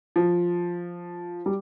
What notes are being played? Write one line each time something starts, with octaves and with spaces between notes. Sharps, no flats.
F3
G3